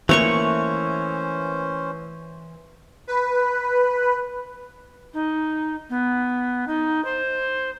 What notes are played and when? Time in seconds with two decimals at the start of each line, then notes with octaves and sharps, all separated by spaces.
0.09 E3 A3 A#3 C#4 C5 C#5 C#6
3.07 B4
5.13 D#4
5.89 B3
6.67 D#4
7.04 C5